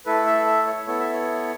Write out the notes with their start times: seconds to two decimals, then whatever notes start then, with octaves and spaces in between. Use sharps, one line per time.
0.06 A3 E4 A4 B4
0.26 E5
0.46 E5
0.67 C#5
0.87 B3 E4 A4 C#5
1.00 E5
1.13 C#5